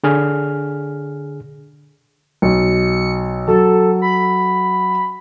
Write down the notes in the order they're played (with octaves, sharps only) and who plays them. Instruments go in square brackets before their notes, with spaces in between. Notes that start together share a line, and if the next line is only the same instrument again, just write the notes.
[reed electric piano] D3 G#4 F6
[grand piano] B1 [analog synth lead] C#7
[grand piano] F#3 [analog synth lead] A4
[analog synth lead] B5